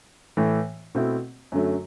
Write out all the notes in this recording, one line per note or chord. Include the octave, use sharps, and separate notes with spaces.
A2 E3 A3
B2 A3 C4 E4
F#2 D3 F#3 A3